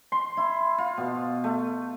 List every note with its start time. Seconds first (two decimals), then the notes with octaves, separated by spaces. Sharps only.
0.12 C6
0.37 E4
0.78 F4
0.97 B2
1.44 A3